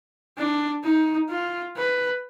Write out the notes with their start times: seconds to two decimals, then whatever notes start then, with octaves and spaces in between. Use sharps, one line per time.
0.38 D4
0.84 D#4
1.30 F4
1.76 B4